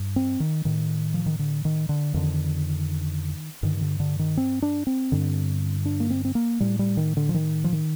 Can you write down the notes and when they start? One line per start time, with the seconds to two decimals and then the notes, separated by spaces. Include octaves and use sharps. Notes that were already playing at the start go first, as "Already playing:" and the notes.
Already playing: G2
0.16 C4
0.40 D#3
0.65 A2 D#3
1.14 F3
1.26 D#3
1.39 D3
1.65 D#3
1.89 D3
2.14 F2 D3 D#3
3.63 G2 D3 D#3
3.81 D3
4.00 D3
4.19 D#3
4.37 C4
4.62 D4
4.87 C4
5.12 G2 D3
5.85 D4
6.00 A#3
6.10 C4
6.25 C4
6.35 A#3
6.60 A2 G3
6.79 G3
6.97 D#3
7.17 D3
7.29 F3
7.34 D#3
7.64 F3
7.73 D#3